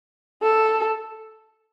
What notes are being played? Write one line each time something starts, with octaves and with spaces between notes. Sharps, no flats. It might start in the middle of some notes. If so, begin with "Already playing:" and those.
A4